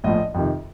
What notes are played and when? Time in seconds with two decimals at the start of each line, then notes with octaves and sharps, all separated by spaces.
0.04 A#1 A2 F3 D#5
0.34 F2 C3 D#3